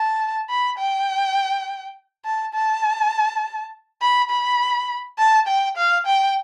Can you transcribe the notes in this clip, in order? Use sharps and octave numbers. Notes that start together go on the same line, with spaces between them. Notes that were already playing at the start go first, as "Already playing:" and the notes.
Already playing: A5
B5
G5
A5
A5
B5
B5
A5
G5
F5
G5